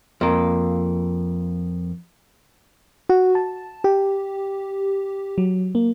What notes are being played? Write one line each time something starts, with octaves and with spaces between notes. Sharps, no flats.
F2 A#3
F#4
A5
G4
F#3
A#3